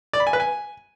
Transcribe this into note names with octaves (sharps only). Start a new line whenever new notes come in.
D5
B5
G#5
B4
G#5